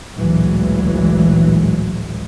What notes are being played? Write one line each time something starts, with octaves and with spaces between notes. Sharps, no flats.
A1 D2 A#2 E3 F#3 G#3